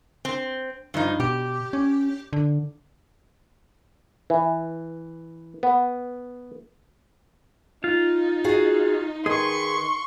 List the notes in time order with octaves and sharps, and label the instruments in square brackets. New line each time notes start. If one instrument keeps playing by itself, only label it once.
[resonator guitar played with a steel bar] C4
G2 F3 D#4
[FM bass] B2 [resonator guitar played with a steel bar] G4
[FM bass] C#4
D3
[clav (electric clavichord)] E3
B3
[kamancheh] D#4 [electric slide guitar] F4
[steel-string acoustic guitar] F#4 G#4 F5
[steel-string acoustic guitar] D#3 [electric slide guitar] G#4 B4 [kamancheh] C6 C#6